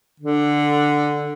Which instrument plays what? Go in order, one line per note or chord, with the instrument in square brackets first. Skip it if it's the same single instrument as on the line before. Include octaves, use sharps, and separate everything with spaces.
[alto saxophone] D3